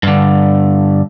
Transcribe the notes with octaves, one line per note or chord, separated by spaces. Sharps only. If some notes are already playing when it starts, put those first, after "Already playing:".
G2 D3